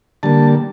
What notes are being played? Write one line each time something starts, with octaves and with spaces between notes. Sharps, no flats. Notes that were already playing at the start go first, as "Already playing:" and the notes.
D3 G3 A#3 A5